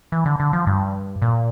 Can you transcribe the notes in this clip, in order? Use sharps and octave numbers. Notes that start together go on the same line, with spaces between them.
E3
D3
D3
F3
G2
A#2